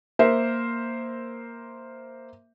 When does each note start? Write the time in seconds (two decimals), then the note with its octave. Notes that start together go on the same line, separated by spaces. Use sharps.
0.19 A#3 A#4 C5 E5